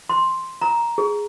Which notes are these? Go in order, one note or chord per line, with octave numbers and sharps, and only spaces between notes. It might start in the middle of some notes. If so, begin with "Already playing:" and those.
C6
A#5
G#4